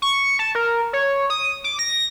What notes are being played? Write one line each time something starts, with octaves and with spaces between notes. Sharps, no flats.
C#6
A5
A#4
C#5
D#6
D6
A#6